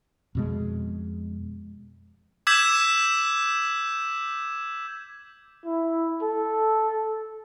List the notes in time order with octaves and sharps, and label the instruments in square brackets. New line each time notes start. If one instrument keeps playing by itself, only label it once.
[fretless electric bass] F2 B2 G#3
[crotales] D6 E6 G6 G#6 B6 E7
[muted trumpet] E4
A4